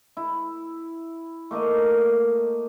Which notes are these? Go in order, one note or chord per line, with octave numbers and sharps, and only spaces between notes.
E4
A3 A#3 A#4 D#5